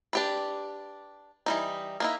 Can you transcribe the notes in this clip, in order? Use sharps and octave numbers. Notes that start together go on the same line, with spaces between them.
D4 G4 B4
E3 G3 D#4
A#3 D#4 E4